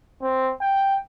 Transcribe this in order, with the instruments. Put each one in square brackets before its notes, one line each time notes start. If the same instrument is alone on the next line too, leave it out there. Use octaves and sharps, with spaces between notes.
[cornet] C4
G5